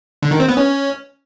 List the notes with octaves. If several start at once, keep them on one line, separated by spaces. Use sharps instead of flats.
D3
D#3
C4
B3
C#4